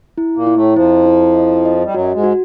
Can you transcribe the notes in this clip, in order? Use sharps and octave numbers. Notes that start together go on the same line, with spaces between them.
E4
A#2 A#3
E4
A2 A3
F2 F3 E4
E4
D#5
D#5
G3
F#2 F#3 F#4
G#2 G#3
F#4